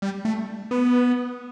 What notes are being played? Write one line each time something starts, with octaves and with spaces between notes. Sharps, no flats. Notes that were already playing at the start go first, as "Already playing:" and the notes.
G3
A3
B3